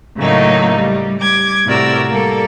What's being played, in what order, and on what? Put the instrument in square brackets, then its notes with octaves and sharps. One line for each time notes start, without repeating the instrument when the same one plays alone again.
[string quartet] A2 C#3 F#3 A3 A#3 D#4
G3
G3 D6 G#6
A2 C3 F#4 A#4 D5 E6
G3 A#3 A4